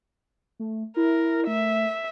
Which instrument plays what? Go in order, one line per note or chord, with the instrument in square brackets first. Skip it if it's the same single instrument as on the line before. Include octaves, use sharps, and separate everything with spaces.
[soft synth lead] A3
[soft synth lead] E4 [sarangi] A#4
[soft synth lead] A3 [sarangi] E5